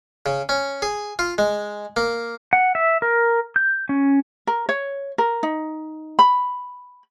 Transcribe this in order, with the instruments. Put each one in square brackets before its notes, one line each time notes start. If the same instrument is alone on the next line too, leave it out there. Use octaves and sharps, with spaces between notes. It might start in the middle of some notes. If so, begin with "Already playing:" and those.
[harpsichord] C#3
C#4
G#4
F4
G#3
A#3
[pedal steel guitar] F#5
E5
A#4
G6
C#4
[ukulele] A#4
C#5
A#4
D#4
B5